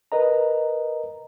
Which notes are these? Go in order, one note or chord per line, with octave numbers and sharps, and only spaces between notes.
A#4 B4 D#5 A#5